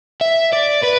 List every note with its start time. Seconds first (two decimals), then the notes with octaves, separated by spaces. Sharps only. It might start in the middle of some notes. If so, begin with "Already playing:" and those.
0.21 E5
0.53 D5
0.83 B4